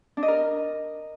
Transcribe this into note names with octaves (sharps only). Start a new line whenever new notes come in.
D4
D#5
A#4